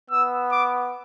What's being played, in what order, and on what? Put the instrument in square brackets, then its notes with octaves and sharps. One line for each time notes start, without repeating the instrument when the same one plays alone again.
[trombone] B3 [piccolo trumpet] E6
[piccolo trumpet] D6